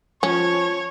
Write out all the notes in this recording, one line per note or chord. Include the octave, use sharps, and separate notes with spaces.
F3 C#4 C#5